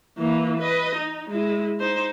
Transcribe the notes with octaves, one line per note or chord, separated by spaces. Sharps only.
E3 A#3
B4 D#5
D#4
G#3 E4
D#4 C5